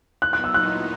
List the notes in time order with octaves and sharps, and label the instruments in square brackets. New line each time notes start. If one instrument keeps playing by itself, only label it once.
[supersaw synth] A#2 F#3 B3 D#4 [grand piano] F#6
[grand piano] F#6
E6
F#6